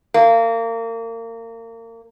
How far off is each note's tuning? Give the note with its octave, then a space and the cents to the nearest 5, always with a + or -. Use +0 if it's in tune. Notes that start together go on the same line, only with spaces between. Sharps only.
A#3 -30